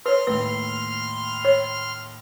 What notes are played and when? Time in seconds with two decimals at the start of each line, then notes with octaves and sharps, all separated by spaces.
0.06 B4 C#5 C6 F6
0.27 D#2 A2 B4
1.45 C#5